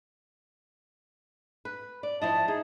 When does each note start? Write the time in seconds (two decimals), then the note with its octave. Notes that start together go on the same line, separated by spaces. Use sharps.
1.65 B4
2.03 D5
2.21 F3 E4 D#5 A5
2.48 D#4 G#4